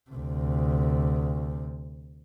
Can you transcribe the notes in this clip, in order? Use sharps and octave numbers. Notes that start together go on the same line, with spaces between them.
D2 C3